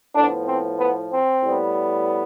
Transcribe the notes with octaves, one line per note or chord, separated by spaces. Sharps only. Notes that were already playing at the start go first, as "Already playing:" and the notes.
A2 D3 F3 B3 D4
C4
B3
C4
A2 G3 B3